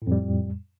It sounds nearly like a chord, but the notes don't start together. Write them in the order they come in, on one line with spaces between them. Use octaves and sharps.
A2 F2 G3